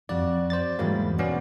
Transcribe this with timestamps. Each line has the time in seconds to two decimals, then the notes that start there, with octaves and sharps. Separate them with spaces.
0.09 F2 F#4 D5
0.50 C5 D5 A6
0.79 E2 G#2 F#3 G3 A#3
1.18 B2 B3 C#4 D5